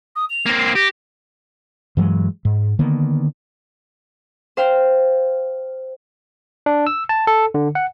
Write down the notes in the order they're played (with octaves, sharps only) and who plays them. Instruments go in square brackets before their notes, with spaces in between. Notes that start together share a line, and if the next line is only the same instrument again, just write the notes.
[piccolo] D#6
F7
[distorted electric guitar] A#3 C4
[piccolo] C7
[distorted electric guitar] G4 [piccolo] A#6
[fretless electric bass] G2 E3 F#3 G#3
G#2
D3 D#3 A#3 B3
[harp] C5 F5 G5
[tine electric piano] D4
E6
A5
A4
D3
F#5